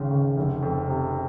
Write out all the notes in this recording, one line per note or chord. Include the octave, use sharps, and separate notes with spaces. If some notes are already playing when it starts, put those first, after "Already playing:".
Already playing: G#1 C#2 C#3
C#2
F1
F2
C3